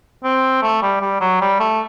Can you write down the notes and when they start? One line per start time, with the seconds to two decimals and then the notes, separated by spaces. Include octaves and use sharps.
0.24 C4
0.62 A3
0.82 G3
1.01 G3
1.20 F#3
1.41 G3
1.60 A3